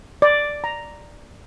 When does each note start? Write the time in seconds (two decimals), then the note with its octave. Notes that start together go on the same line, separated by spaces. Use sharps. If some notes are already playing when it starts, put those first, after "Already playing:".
0.22 D5
0.64 A#5